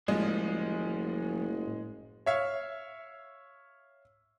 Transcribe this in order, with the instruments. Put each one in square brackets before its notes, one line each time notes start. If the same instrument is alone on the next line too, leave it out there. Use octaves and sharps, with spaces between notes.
[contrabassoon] F#1 [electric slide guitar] A2 F4 [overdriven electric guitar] F3 G3 [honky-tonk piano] G#3
[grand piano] C#5 E5 F5